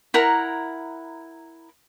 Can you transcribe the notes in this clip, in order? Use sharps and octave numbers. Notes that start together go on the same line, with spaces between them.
E4 A#4 F#5 A#5